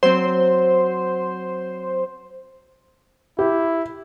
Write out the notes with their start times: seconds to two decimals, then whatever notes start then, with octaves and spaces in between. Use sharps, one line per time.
0.03 F#3 C4 C5
3.39 E4 G4